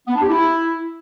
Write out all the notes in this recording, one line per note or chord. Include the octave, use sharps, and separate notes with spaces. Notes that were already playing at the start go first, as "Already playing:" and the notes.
B3
D4
G4
E4